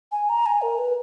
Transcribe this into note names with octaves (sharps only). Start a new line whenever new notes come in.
G#5
A#5
G#5
A#4
B4